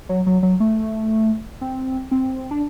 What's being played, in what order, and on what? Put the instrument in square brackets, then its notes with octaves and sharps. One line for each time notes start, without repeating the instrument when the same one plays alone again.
[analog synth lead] F#3
F#3
F#3
A3
C4
C4
D4